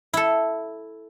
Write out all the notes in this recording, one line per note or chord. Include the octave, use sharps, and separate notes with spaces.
E4 A4